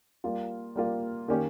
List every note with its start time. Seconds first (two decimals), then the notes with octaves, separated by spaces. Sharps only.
0.24 G3 A#3 F4
0.76 G3 A#3 F4
1.28 D#3 A#3 C#4 G4 C#5